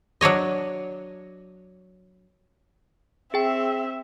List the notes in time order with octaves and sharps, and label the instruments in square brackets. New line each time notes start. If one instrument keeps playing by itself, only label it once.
[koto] F#3 D4 C#5 D#5
[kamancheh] C4 E5 [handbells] G#4 G5